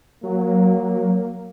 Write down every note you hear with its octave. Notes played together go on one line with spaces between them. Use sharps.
F#3 A#3